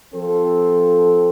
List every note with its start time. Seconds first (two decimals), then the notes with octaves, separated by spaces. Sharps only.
0.14 F3 C4 F4 A4